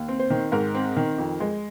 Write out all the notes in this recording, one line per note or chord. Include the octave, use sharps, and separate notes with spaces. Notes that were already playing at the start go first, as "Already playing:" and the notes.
Already playing: D#2
C4
C5
D#3
G#2 A#4
C4
D#3
F2
G#3